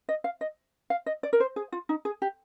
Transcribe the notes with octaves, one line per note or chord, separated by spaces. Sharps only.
D#5
F5
D#5
F5
D#5
D5
A#4
C5
G#4
F4
D#4
G#4
G4